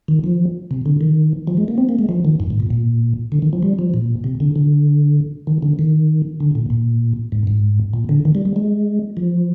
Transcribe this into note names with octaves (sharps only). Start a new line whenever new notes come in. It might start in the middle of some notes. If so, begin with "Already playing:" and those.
D#3
F3
C3
D3
D#3
F3
G#3
A#3
C4
A#3
G#3
F3
D#3
G2
G#2
A#2
A#2
D3
D#3
F3
G3
F3
A#2
C3
D3
D3
D#3
D3
D#3
D3
A#2
A#2
G#2
G#2
A#2
D3
D#3
G3
G3
G#3
F3